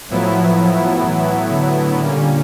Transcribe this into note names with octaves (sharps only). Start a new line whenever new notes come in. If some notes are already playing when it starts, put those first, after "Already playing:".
A2 F3 F#3 B3 E4
E3
D3
A#2 G3 A#3 C#4